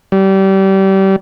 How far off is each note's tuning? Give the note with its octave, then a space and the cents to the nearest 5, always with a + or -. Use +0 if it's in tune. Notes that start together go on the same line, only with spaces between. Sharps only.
G3 -25